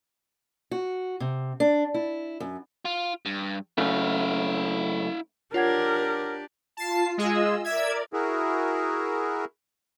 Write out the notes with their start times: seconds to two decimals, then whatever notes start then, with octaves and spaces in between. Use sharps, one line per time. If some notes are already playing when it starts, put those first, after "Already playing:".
0.71 F#4
1.20 C3
1.60 D4
1.94 E4
2.40 F#2
2.85 F4
3.26 G2
3.78 F#2 C#3 A3 E4 F5
5.54 D4 F4 G4 A#4 C#5 F#5 G#6
6.77 F4 A5 C7
7.18 G#3 F4 G#4 D#5 E6
7.64 A#4 D5 E5 G#6
8.13 E4 F#4 G#4 A#4